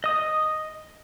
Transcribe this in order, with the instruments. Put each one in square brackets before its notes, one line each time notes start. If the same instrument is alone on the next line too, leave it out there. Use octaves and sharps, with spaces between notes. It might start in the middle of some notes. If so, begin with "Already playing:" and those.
[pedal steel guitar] D#5 D#6